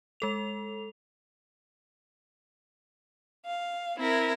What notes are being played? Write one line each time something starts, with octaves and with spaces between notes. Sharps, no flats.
G#3 A4 F7
F5
C4 E4 A#4